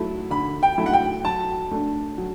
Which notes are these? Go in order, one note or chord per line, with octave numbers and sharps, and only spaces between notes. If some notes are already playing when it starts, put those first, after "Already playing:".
Already playing: F#3 A3 E4
D3 B5
G5
F#3 A3 E4
F#5
G5
F#3 A5
A3 D4
F#3